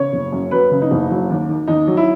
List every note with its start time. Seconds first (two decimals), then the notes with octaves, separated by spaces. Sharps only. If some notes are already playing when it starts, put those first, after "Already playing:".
Already playing: C#3 C#5
0.13 F#1
0.32 F#2
0.51 F#3 B4
0.71 C#3
0.81 D#4
0.91 F#1
1.11 F#3
1.30 D#2
1.48 D#3
1.68 D#2 D#4
1.87 F#3
1.97 E4